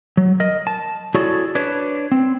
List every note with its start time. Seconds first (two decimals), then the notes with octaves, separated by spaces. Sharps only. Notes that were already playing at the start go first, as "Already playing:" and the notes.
0.17 F#3
0.40 A#4 D#5
0.67 A5
1.14 E4 F#4 G#4 A4 C#5 D5
1.55 D4 B4 C#5
2.12 C4